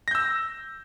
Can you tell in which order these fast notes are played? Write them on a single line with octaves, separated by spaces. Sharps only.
A#6 G6 E6